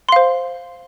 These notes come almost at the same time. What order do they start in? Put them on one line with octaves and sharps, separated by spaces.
C6 F5 C5